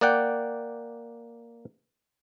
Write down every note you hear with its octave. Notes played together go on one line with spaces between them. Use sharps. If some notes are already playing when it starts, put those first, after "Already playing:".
A#3 D5 F#5 G5